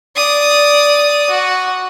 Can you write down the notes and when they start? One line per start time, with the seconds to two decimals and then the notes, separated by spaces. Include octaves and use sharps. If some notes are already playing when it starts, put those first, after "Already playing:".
0.16 D5 D#6
1.30 F#4